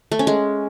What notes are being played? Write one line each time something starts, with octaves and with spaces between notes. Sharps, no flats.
A3
C#4
G#3